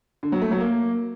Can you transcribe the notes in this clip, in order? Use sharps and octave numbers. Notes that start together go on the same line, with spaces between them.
D3
F#3
A3
F#3
A#3